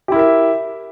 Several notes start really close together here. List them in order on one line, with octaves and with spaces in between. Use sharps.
G4 E4 A#4 E5